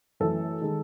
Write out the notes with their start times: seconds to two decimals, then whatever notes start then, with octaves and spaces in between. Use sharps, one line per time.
0.20 F#2 E3 A3 A4
0.62 D#3 G#3